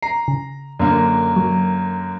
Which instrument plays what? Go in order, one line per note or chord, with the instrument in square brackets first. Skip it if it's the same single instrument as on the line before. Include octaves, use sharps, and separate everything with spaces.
[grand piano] A#5 [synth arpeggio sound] C7
[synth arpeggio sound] C#3
[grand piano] F#2 D3 A#3
[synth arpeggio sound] F#3